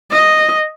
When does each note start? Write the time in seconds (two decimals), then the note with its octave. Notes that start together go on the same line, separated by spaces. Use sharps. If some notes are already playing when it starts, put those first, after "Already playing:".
0.12 D#5